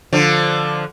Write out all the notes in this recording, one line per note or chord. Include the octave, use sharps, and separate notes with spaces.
D3 F3